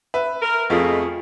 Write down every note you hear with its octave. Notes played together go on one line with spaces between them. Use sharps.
B4 E5
A#4
F2 B2 F3 A3 F4 G#4